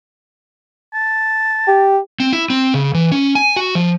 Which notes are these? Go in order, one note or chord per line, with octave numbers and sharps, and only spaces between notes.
A5
G4
C4
E4
C4
C#3
E3
C#4
G#5
F#4
F3